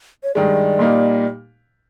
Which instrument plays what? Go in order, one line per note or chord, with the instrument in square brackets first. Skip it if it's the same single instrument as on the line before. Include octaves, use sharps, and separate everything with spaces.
[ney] C#5
[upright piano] G2 D#3 G#3 [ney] D5
[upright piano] A#2 G3 A#3 D#4